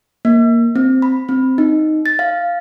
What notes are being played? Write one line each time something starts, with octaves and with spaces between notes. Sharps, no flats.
A#3
C4
B5
C4
D#4
A6
F5